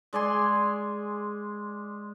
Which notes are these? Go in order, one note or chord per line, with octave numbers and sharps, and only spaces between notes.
G#3 D5 G#5 C6